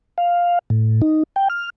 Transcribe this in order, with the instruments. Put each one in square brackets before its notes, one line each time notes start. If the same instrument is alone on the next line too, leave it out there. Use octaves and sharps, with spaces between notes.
[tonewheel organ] F5
A2
D#4
G5
F6